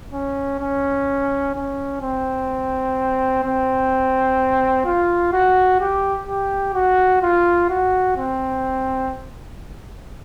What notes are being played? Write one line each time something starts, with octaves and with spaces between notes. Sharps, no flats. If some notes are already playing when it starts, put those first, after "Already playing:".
C#4
C#4
C#4
C4
C4
F4
F#4
G4
G4
F#4
F4
F#4
C4